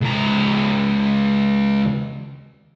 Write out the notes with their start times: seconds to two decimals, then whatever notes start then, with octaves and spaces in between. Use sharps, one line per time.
0.02 C#2 A#5